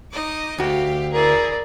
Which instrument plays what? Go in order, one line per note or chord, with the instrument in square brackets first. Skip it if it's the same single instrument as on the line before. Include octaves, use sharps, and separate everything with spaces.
[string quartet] D#4 D#5 D6
[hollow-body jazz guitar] D2 F#4 [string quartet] A3 G4 F5
[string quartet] E4 G#4 [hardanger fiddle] A#4 D5